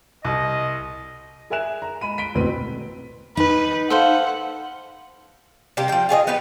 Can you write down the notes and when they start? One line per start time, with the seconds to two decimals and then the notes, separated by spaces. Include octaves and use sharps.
0.25 C2 D#5
1.50 G#4 A#4 E5 G#5 F#6 E7
1.82 A#5
2.01 G#3 B5 D#7
2.18 B6 D7 G7
2.35 A1 D2 B2 C4 B4 D#7
3.37 D#4 B4
3.90 A4 C5 F5 F#5
5.77 C3 G3 A#3 G4
5.89 F3 G5
6.09 F4 G#4 C#5 D#5
6.27 B3 D#4 G4 B4